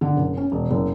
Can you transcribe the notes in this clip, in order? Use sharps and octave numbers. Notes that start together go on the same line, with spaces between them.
D3
F#1
C#4
E1
F#1